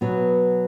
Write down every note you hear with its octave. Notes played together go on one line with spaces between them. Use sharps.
B2 F#3 B3